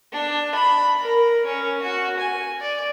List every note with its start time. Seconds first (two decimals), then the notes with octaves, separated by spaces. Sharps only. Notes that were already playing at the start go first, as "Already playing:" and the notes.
0.12 D4
0.55 B5
1.00 A#4
1.46 C#4
1.82 F#4
2.19 G#5
2.61 D5